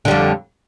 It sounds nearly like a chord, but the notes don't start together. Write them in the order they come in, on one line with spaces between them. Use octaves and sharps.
D3 G3 F2